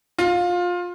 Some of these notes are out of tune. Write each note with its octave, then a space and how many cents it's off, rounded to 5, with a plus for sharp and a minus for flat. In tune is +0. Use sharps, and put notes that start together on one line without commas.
F4 +20